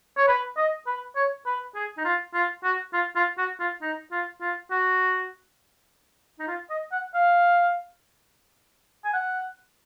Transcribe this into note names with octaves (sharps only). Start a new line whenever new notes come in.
C#5
B4
D#5
B4
C#5
B4
G#4
D#4
F4
F4
F#4
F4
F4
F#4
F4
D#4
F4
F4
F#4
D#4
F4
D#5
F#5
F5
G#5
F#5